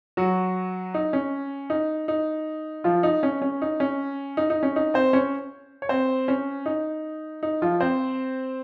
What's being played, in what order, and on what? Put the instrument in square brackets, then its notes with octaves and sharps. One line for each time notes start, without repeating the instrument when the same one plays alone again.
[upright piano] F#3 F#4
D#4
C#4
D#4
D#4
F3 F4
D#4
C#4
C#4
D#4
C#4
D#4
D#4
C#4
D#4
C4 C5
C#4 C#5
C#5
C4 C5
C#4
D#4
D#4
F3 F4
C4 C5